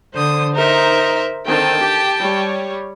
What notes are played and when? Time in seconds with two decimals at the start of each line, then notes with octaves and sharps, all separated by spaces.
0.14 D3 C5 D#6
0.56 D#4 A#4 C5 E5
1.46 D3 D#3 C4 G5 A5
1.81 G4
2.19 G3 C#5